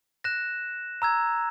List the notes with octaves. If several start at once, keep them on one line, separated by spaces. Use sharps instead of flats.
F#6 A#6 E7
A#5 E6 G#6